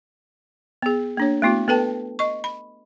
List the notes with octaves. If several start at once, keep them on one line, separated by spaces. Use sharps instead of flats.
B3 G#4
A#3 D4 C#5
A3 B3 E4 F#4
B3 A4 B4 G5 A5
D#5 C#6
B5